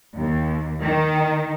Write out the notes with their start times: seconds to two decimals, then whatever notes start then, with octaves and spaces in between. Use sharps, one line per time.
0.17 D#2
0.81 D#3